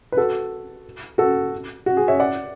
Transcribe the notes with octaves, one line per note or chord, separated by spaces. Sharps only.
B4
F#4 A4
F#4 A4
F#4
G#4
C#5 E5
D5 F#5